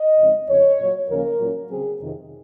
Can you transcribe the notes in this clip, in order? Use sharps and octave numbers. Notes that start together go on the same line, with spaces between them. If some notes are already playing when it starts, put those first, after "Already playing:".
Already playing: D#5
F2 C#3 G#3 C4 D#4
F2 C#3 F3 C#5
A#2 F#3 A#3
D#2 C#3 F3 A#3 C#4 A#4
A#2 F#3 C#4
C#3 F#3 C4 G#4
F2 C3 D#3